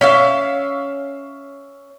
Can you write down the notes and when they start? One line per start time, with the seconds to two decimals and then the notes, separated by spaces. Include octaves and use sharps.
0.01 C#4 E5 F5